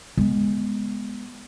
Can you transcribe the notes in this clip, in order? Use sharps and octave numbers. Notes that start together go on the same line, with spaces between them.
G#3 B3